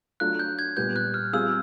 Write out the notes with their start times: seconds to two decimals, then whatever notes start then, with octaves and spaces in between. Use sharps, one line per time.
0.20 F#3 A3 D4 F4 F#6
0.39 G6
0.59 G#6
0.77 A#2 G3 B3 G6
0.96 F#6
1.14 F6
1.33 G3 C4 F4 G#4 E6